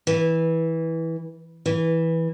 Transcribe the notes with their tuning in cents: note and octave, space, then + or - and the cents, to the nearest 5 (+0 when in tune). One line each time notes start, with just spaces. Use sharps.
E3 -15
E3 -10